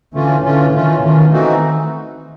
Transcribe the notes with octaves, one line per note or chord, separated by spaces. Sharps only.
D3 E3 A3 C#4 F4
D3 E3 A3 C#4 F4
D#3 E3 A3 C#4 F4
D#3 E3 A3 C#4 F4
E3 A3 C4 D#4 F#4